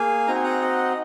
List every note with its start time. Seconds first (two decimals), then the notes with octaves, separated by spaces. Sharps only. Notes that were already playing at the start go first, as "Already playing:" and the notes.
Already playing: A#3 G#4 F5 G#5
0.27 C4 D#4 F#4 A#5
0.35 G#5
0.44 F#5 A#5
0.62 D#5 F#5